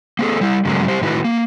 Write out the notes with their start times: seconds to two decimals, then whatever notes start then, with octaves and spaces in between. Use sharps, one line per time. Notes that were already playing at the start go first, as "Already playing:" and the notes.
0.19 A#3 C4 G#4 A4
0.41 G3 E4
0.65 G2 C#3 F#3 G#3 A#3
0.88 G3 G4 C5
1.02 A2 D#3 E4 F#4 B4
1.24 A#3